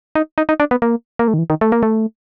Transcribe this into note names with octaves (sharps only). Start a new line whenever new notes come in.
D#4
D#4
D#4
D4
B3
A#3
A#3
A3
D#3
E3
D#3
A3
A#3
A3